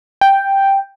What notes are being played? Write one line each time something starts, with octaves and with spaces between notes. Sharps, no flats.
G5